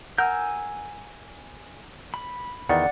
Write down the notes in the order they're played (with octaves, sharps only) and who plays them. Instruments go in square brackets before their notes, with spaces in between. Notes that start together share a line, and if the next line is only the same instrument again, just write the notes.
[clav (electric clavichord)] A#4 [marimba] F#5 [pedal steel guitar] G#5 E6 G6
[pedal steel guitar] B5
[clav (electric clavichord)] E2 D#3 [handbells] D5 F#5